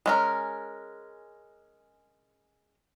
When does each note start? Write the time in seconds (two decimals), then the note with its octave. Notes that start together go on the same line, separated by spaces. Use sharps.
0.06 G#3 C#4 A#4